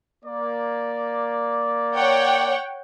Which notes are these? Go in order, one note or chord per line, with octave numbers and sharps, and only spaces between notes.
A#3 D5
C#5 F#5 G5